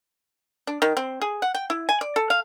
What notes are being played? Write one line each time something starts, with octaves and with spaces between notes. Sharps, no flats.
D4
D#3
C4
G#4
F#5
G5
E4
G#5
D5
A4
F5